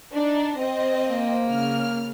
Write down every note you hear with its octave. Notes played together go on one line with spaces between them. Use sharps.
D4 D#4
C4 D#5
A#3
C#3 F6